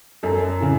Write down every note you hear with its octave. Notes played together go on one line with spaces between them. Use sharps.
F#2 A4
C#3 E3